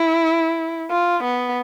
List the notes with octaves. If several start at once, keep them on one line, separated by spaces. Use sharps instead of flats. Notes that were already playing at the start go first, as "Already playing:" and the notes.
Already playing: E4
F4
B3